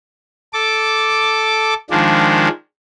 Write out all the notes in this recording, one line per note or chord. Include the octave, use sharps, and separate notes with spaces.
A4 D6
D#3 F3 G#3 D4